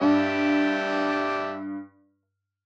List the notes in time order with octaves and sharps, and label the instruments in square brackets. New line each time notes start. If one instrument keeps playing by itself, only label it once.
[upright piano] G2 [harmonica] D4 G4 E5